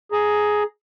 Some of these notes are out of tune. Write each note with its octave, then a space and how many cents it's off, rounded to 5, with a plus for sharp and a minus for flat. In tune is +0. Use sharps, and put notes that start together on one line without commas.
G#4 +10 A#5 +0